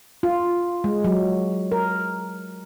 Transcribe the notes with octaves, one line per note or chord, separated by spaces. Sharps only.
F4
G#3
F#3
A#4